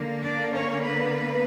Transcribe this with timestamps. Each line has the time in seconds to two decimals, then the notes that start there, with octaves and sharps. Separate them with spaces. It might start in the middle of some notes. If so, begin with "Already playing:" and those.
Already playing: D3 A#3
0.22 D4 D5
0.53 C#4 C#5
0.84 B3 B4